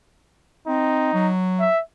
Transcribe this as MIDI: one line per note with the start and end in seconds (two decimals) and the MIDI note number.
0.68 1.14 60
0.68 1.32 63
1.14 1.67 54
1.60 1.81 76